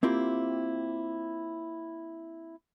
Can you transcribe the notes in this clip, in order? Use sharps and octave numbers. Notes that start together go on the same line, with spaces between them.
A#3 C4 E4 F4 G4